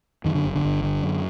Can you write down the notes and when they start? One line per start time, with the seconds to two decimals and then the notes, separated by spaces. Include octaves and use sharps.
0.25 F#2 D#3
0.35 D3
0.45 G1
0.55 D3
0.65 G1
0.84 D3
1.03 F#2